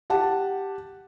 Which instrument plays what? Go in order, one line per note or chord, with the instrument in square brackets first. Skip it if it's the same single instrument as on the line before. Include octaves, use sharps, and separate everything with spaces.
[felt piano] G4 F#5 A5